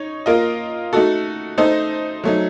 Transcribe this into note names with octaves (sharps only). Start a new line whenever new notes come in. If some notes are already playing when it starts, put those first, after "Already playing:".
Already playing: D#4 C#5
A#3 F4 A#4 D#5
A3 D#4 F#4 A4
A3 D#4 A4 C5 D#5
F#3 A3 D#4